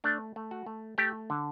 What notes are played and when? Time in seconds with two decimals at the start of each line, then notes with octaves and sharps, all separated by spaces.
0.04 A3 D4
0.36 A3
0.51 F#4
0.66 A3
0.98 A3 G4
1.30 D3